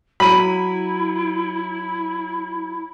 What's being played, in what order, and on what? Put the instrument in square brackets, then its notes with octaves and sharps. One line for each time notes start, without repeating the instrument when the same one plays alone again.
[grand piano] F#3 D#7 [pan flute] E4 [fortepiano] B5